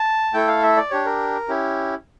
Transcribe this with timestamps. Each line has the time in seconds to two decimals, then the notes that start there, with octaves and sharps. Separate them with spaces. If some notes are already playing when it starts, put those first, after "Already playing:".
Already playing: A5
0.33 A3 E4 A4 G5
0.48 F5
0.62 E5
0.76 D5
0.90 D4 G4 C#5
1.06 A#4
1.48 C#4 E4 G4